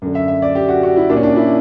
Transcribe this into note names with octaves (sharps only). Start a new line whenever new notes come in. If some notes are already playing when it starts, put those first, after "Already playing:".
F#2 D3
E5
E5
D5
G4
F#4
F#4
E4
A#2 D4
C#4
D4
E4